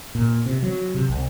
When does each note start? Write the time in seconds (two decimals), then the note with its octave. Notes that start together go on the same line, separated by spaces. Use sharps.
0.15 A#2
0.46 C3
0.63 F#3
0.94 C3
1.09 C2